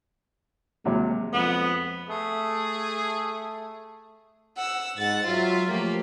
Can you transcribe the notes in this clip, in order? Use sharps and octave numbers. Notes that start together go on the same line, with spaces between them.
D#2 C3 F#3 G#3
F2 B3
A3 G#4
F#5 E6
G#2 F#5 A6
F#3 F4 E5
F3 A3 A#3 G4